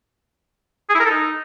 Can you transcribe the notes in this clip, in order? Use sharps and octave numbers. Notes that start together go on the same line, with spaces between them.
G#4
E4
A#4
A4
D#4